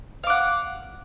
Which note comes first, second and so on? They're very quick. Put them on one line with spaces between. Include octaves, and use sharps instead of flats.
F5 D6 F#5